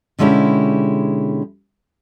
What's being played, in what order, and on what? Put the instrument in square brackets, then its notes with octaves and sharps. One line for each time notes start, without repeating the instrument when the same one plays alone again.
[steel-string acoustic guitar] B2 D3 G#3 C#4 E4 G4